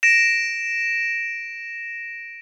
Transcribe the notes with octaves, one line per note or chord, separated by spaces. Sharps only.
A#6 D7 E7